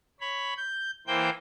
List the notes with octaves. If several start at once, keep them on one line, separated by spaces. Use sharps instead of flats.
C#5 B5
G6
E3 A#3 C5 G5 G6